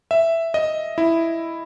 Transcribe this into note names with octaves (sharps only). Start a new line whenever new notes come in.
E5
D#5
E4